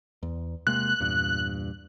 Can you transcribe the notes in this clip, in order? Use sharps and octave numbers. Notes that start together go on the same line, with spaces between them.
E2
C3 G#3 A#3 F#6
E2 G2 A#2